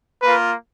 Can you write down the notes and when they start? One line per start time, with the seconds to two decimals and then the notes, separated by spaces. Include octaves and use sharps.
0.22 A#3 F4 B4